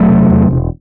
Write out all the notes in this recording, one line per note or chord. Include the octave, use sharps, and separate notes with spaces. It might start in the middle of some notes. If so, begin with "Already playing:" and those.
Already playing: E1 F#3 A3
C3
E2
E1